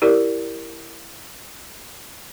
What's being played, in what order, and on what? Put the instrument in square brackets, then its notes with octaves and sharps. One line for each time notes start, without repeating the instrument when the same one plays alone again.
[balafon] E4 G4 A#4 D5